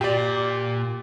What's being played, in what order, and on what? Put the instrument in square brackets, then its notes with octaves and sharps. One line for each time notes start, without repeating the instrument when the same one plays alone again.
[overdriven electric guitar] A#2 [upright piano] G4 D5